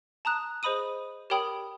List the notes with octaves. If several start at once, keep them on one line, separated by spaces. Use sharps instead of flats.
A5 A#5 D#6 F#6
G#4 C5 D#5 B5 D#6 D#7
G4 A#4 C#5 G5 B5 D#6